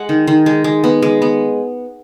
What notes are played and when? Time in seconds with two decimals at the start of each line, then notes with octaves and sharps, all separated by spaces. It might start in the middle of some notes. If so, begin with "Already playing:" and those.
Already playing: G#3 F#5
0.09 D#3
0.27 D#3
0.46 G#3
0.64 G#3
0.84 B3
1.02 G#3
1.22 B3